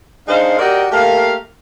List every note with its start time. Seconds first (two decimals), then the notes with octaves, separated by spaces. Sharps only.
0.28 G#3 D4 D#4 C5 F5
0.59 F#4 G4 A#4 D5 D#5 G5
0.92 A3 A#3 G4 A#4 F5